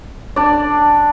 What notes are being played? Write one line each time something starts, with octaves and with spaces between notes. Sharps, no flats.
D4 D5